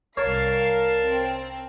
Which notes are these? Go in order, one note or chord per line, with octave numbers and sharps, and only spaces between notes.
C2 A#4 C#5 F5 A5 C7
C4